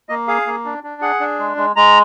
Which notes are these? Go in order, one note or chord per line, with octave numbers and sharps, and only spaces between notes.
A#3 D#5
G#4 F5
A#3
D4
D4
G#4 F#5
D4
G#3
G#3
G#3 A#5